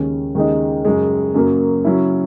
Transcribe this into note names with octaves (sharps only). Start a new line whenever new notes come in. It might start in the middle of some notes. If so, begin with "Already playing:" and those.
Already playing: D#2 C#3 G#3 C#4
D#2 C#3 G#3 D#4
F#2 C#3 G#3
F#2 C#3 F#3 A#3
C#3 F#3 C#4 E4